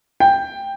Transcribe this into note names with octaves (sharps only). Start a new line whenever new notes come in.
G5